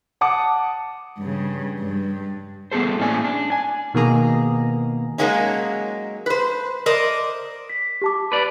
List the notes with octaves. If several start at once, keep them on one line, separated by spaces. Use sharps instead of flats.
F#5 A5 D6 D#6 C#7
G2 C#3
G2
G3 B3 G#4 A4 C5
A2 A#3 C#4 D5 G#5
D4
G#5
B2 D#3 A#3 G#4 A#5
F#3 G#3 A#3 C#4 D#4
B4 C5
A#4 C5 D5 D#5
B6
G4 A5 D6
B4 D5